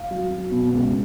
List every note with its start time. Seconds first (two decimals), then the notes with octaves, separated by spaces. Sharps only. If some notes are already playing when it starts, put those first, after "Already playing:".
Already playing: F5
0.11 F#3
0.31 F#3
0.51 B2
0.73 C#2